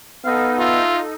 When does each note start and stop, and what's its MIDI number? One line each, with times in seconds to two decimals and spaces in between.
0.25 0.80 59
0.25 1.15 63
0.25 1.15 69
0.25 0.52 77
0.25 1.15 88
0.58 1.01 65
0.58 0.96 76